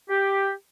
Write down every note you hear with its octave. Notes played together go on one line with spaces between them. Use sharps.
G4